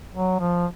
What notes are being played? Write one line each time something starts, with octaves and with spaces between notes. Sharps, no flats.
F#3
F3